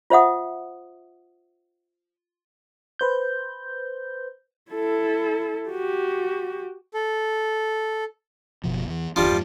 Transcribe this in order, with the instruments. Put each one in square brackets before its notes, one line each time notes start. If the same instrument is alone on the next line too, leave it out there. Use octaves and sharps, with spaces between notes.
[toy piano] F4 C5 E5 F#5 D#6
[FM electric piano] B4 C5 G6
[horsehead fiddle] E4 A4
F#4 G4
[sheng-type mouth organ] A4
[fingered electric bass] F#1 B2 F3
E2 E3
[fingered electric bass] F#1 E2 D4 [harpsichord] F3 G3
[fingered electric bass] F2 G#2